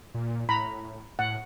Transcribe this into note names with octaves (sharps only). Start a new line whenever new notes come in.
A#2
A2 A#5 B5
A2 F#5